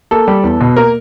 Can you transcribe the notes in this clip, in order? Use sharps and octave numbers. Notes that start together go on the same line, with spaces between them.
A#3 A4
G3
E2
B2
A#3 A#4